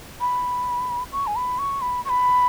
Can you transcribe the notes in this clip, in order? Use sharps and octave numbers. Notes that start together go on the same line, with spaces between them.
B5
C#6
G#5
B5
C#6
B5
C#6
B5